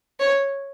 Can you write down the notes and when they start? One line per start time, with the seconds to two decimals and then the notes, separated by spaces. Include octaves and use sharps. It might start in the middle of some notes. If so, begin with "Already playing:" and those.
0.20 C#5